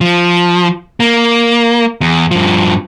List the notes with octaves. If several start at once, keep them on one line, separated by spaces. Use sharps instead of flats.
F3
A#3
E2
G2 F3